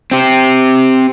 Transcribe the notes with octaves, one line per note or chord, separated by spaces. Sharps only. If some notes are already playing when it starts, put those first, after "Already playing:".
C4 G4